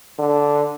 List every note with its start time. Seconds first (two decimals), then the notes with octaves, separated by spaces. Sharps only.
0.19 D3